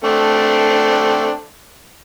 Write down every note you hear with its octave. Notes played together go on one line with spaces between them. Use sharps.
A3 C4 D4